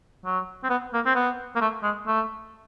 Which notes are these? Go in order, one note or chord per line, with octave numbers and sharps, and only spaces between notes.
F#3
C4
B3
A#3
C4
B3
A#3
A3
G#3
A3